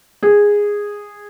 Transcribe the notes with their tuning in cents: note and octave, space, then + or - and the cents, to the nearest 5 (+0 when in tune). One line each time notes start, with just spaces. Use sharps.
G#4 -10